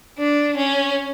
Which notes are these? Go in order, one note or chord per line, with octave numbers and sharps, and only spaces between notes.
D4
C#4